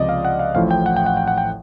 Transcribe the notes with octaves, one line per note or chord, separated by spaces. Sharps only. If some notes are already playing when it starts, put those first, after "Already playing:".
Already playing: C#2 C3 F3 D5 D#5
F5
F#5
F5
A1 A2 F3 F5
G5
F#5
G5
F#5
G5
F#5
G5